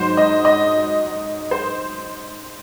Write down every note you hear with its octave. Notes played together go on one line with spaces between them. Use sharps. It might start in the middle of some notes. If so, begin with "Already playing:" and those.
Already playing: G#2 F#3 C5
D#5
D#5
C5